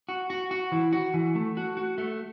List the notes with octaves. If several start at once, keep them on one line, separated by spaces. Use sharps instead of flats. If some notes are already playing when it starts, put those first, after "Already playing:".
F#4
F#4
F#4
E3
F#4
E3
A3
F#4
F#4
A3